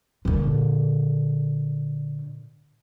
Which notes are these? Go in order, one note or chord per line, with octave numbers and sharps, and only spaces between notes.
A#2 D3